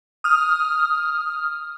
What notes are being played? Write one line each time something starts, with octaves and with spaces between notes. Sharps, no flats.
D#6 F6